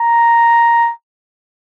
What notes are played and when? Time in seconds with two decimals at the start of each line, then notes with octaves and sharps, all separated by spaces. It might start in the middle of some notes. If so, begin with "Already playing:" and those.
Already playing: A#5